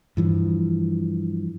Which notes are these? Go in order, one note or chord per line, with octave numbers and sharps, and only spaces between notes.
G2 E3 F3